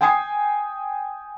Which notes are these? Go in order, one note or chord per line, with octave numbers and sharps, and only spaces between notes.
G5 G#5 D#6 G#6 C7